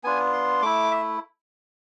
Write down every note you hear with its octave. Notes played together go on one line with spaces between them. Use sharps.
B3 D4 F4 G#5
C6
A3 E4 D6
E5